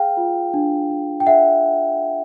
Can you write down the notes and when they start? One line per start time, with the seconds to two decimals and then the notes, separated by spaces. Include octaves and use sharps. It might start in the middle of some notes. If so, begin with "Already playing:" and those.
Already playing: G#4 F5 G5
0.17 F4
0.54 D4
0.90 D4
1.20 G5
1.27 G#4 E5 F#5